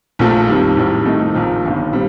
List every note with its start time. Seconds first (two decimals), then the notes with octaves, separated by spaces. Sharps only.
0.19 A#1 A#2 F3 A3
0.47 F2 D#3 G3
0.77 A#1 A2 G3
1.05 F2 D#3 A3 D#4
1.34 A#1 A#2 F3
1.63 G1 G2 D#3
1.92 A#2 G3 C4